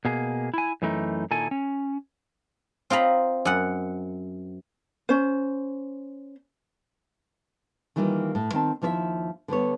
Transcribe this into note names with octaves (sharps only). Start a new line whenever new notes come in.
B2 A#3 G#4
E4 G#5
F#2 E3 A3 D#4
A#2 D#3 E4 A4 G#5
C#4
C4 F4 D#5 A#5 B5
F#2 F#5
C#4 C5
D#3 E3 G3 A#3 D4 F4
A2
D#3 C4 A5
D#2 F3 E4 C#5 E5
D3 G3 B3 C#5